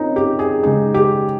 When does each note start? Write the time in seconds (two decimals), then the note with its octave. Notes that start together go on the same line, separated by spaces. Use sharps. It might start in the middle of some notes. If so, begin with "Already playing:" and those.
Already playing: C4 C#4 D#4 F4 A#4 D#5
0.16 G4
0.39 G#4
0.63 C#3 G#3 D#4 G#4
0.94 G4